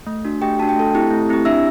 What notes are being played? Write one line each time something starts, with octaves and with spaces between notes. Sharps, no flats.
A3
D4 F#4
A3 G4 G5
D4 F#4 A5
G5
A3 A4 A5
C4 E4 G4
A3
C4 E4 G4
D4 E5 E6